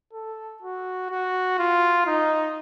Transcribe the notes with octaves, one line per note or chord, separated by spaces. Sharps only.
A4
F#4
F#4
F4
D#4